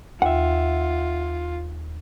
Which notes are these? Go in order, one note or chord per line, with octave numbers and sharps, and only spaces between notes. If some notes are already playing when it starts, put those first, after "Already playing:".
D#2 F4 E5 F#5